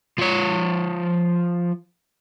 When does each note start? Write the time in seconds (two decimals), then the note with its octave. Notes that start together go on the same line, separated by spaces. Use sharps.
0.19 F3 C#5